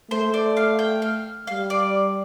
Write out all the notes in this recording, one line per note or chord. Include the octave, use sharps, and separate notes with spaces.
A3 C5
D5
F5
G5
F5
G3 F5
D5